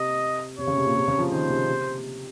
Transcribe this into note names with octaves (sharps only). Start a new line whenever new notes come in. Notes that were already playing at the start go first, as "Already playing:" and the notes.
Already playing: C3 D#5
C3 C#5
C#3
C3
A#2
C3
C#3
F3
D#3 C5
C3
C3